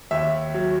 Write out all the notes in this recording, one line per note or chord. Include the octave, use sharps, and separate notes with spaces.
D#2 E5
F#3